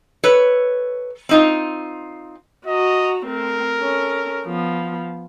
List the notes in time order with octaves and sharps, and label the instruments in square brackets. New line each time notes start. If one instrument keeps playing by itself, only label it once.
[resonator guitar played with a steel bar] A4 B4 C#5
C4 D#4 F4
[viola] F#4 A#5 [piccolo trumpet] D#5
[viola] A3 C4 [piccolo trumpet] A#4
[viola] C#4 A4
F3 B3